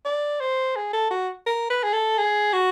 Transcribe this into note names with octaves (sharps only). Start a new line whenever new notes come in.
D5
C5
G#4
A4
F#4
A#4
B4
G#4
A4
G#4
F#4